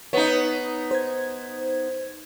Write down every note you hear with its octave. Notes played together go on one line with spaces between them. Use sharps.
B3 D#4 C#5
C5 G#6